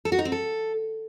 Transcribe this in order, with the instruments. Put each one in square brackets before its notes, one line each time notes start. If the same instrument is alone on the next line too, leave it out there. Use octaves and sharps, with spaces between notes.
[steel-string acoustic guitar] A4
F#4
D#4
C4
A4